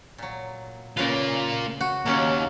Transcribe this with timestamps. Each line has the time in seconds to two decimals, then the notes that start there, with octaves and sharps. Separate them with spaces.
0.18 A#2 F#3
0.97 C#3 A#3 F4 B4
1.81 F#4
2.06 D#2 A#3 C#4 C#5